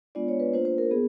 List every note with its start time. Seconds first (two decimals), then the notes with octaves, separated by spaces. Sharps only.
0.15 G#3 B3 D4 F4 D5
0.28 C#5
0.40 B4
0.53 A#3 D4 F4 C5
0.65 C5
0.78 A#4
0.91 B3 G#4